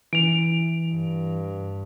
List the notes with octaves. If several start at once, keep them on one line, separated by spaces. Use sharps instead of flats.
E3 D7 F7
G2